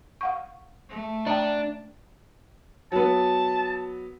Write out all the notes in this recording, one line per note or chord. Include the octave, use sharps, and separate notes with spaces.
F5 F#5 C#6
A3
D4 G5 A5 A#5
F#3 B3 A5